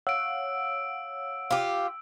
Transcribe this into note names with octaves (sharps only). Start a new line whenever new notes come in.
C#5 F5 F#5 E6 D7
F4 G4